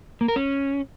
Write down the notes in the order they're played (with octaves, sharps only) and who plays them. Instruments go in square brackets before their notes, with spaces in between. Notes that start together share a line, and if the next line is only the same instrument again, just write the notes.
[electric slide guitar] A#3
A#4
C#4